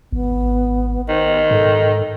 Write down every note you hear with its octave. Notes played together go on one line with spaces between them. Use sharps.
G#1 B3
D#3 C5
G#2 A4